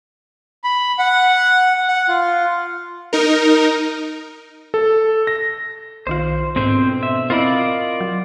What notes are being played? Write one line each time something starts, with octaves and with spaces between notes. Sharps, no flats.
B5
F#5
F#5
F4
D#4 A#4
A4
A#6
B1 D#3 F4 C5
G#2 B2 D3 C4 C5
E5
C4 E4 F4 A#4 D5 D#5 B5
F#3